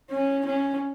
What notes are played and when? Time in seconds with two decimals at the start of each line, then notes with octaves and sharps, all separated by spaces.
0.11 C#4
0.46 C#4